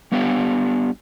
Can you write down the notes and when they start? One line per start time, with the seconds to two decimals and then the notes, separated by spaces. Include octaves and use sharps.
0.12 G3 B3 D4 G4 F5 G5